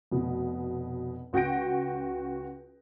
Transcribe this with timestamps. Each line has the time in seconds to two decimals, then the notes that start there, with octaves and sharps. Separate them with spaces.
0.11 F1 B2
1.33 C#2 F#4 G5 G6 A#6 D7